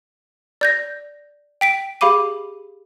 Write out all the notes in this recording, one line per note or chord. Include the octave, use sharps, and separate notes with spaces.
D5 G6 A#6
G5 B6 D7
G4 G#4 F5 B5 D6 D#7